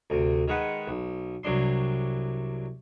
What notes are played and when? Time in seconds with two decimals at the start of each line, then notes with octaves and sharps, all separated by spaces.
0.10 D2 C3
0.48 D#3 G#3 B4 F#5
0.88 B1
1.43 C2 F#3 D4 C6